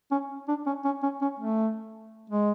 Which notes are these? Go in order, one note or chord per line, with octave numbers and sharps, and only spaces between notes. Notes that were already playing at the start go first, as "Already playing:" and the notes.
C#4
D4
C#4
C#4
C#4
C#4
A3
G#3